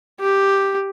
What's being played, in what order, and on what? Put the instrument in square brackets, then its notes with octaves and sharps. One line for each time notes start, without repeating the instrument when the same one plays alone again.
[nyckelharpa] G4